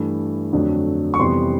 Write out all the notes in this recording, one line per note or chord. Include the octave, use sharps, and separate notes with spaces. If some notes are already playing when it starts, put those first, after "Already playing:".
Already playing: G2 E3 A3
F2 D3 F#3 A3 D4
C#6
F2 C3 E3 G3 B3 C6